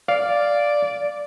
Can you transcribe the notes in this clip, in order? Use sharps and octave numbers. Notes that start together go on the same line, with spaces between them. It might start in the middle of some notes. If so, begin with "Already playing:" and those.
D5 F5